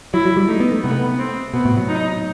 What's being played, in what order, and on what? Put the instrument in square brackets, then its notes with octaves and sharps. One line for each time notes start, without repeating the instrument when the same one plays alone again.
[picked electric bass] F#3 [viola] E4
[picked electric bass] F#3
G3
[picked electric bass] A3 [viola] D#4
[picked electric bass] B3
A3
[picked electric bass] C3 [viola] B3
[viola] C4
[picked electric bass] B2 [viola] B3
[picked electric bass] A2
F#3
[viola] D#4